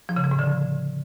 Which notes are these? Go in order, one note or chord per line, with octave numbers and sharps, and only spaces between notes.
F3
C#3
F3
A2
D3